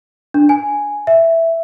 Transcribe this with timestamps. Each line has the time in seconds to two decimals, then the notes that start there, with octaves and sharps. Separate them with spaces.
0.34 D4
0.49 G#5
1.07 E5